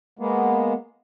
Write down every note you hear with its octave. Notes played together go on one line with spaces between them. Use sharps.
G#3 A#3 B3